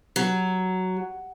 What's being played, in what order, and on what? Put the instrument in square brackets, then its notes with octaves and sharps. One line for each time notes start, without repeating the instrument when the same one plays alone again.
[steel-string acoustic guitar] F#3